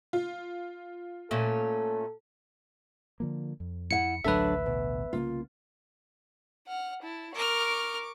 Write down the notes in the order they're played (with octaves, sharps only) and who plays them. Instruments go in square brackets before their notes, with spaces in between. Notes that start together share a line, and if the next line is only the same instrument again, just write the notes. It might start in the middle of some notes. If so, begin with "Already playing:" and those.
[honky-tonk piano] F4
[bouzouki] A#2 A3 C#4 [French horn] A4
[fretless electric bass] D3 F3 A#3
F2
[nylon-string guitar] E4 F5 F#5 [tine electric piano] C#7
[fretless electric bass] A1 D2 [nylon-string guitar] F#3 D4 A4 [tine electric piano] B4 E5
[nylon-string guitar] B2
[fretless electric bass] C2 C#3 A#3 [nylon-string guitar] F4
[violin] F#5 F6
E4 A5
[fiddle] A#4 F6 [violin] C#6 D6